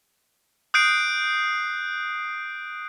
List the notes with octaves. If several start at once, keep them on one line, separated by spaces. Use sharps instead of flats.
D#6 F#6 G6 C7 D7